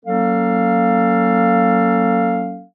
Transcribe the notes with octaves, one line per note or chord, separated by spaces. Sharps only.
F#3 A#3 C#4 A4 F5